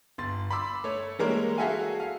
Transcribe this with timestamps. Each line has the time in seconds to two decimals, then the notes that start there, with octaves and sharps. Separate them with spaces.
0.18 G1 C6 A6
0.51 B5 C6 D6 E6
0.84 A3 C#5
1.19 E3 G3 G#3 A#3 A#4 C#5
1.58 F#4 G#4 A4 E5 F5 G#5
2.00 F5